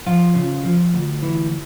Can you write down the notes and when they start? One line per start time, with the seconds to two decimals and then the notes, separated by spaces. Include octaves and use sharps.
0.06 F3 F4
0.35 C#3
0.64 F3
0.93 D2
1.22 E3